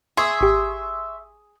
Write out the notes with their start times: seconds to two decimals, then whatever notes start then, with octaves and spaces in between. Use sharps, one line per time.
0.17 G#4 E5 C6 C#6 D#6
0.41 G#1 G4